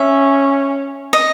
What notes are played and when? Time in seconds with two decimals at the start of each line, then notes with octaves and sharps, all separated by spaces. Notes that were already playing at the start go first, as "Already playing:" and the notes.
Already playing: C#4 E5
1.13 D#5